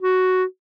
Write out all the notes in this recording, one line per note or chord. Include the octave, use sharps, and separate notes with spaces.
F#4